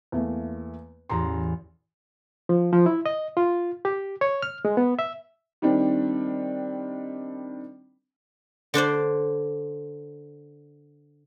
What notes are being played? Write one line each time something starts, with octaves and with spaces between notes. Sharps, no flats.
E2 A3 A#3
A1 E2 A#5 C6
F3
F3
E4
D#5
F4
G4
C#5
F6
G#3
B3
E5
D#3 G3 C4 D4
D3 D4 C5 D5